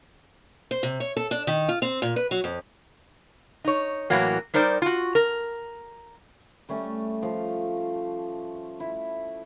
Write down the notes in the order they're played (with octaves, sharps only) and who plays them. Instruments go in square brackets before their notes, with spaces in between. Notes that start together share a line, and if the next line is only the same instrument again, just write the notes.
[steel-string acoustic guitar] C5
C3
C#5
A4
D4
D#3
F4
C4
A#2
B4
F#3
F2
[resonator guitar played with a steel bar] D#4 C#5
A2 E3 F#3 A#3
G3 D#4 A#4 C5 D5
F4 F#4
A#4
[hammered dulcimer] G3 A3 C#4
F3
E4